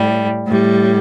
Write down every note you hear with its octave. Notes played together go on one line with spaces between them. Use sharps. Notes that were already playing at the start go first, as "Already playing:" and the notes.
Already playing: A2 G3
A2 G3